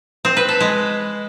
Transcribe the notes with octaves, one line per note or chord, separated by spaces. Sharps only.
C4
B4
A4
G#3